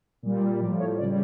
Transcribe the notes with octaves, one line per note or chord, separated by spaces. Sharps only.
A#2 G3
A2 F3 D5
C#5
C#3 G3 D5